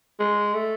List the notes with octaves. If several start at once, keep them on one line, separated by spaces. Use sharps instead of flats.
G#3
A3